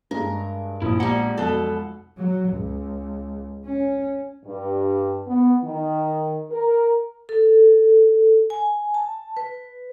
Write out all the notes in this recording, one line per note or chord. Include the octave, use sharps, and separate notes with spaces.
G2 G#3 A#4
A#1 C4 E4 D#6
G3 G#3 A#3 F#5
B1 F2 B2 A4
F#3
C#2
C#4
G2
B3
D#3
A#4
A4
G#5
A5
B4